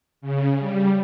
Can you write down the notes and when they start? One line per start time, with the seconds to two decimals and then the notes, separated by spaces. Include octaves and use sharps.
0.21 C#3
0.60 G3